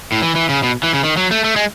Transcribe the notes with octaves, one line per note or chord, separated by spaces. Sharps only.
A2
E3
E3
C#3
B2
E3
C#3
D#3
F#3
A3
A3
G#3